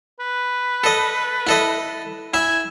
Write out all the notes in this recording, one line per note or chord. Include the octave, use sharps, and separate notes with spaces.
B4
A4 D#5
E4 A4 D#5
E4 E5 G#5